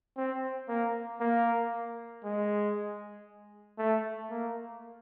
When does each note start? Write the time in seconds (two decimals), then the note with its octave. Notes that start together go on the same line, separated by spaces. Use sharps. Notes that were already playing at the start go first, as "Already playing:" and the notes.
0.17 C4
0.69 A#3
1.20 A#3
2.24 G#3
3.78 A3
4.31 A#3